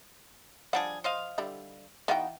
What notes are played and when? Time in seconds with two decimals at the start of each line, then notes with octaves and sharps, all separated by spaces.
0.73 F3 G3 D4 G#4 F#5
1.04 C5 D#5 F5
1.38 D3 G3 E4
2.08 E3 B3 D#4 F#4 F5 G5